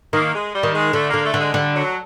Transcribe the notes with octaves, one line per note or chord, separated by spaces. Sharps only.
D#3 A#3
G#3
G3
D#3
G#3
D3 A3
A#3
D3
A3
D3 G#3
D3 G3
F#3